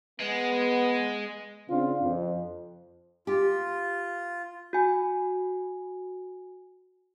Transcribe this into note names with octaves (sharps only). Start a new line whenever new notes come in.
G#3 B3
C#3 C4 D4 F4
F2
F4 G4
F#4 G#5